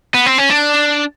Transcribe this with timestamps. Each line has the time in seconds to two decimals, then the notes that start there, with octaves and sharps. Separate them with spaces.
0.14 B3
0.26 C4
0.38 C#4
0.50 D4